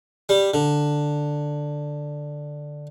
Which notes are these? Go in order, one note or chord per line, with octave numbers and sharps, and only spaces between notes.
G3
D3